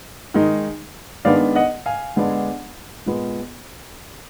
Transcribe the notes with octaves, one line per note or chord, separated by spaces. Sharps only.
D#3 G#3 D#4
D#3 G#3 B3 D4 D5 F5
D#5 F#5
F5 G#5
D3 G#3 B3 D4
A#2 G#3 B3